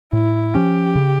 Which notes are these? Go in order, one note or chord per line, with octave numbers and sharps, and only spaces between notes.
A2 E4
F3 C#4 G4
C#3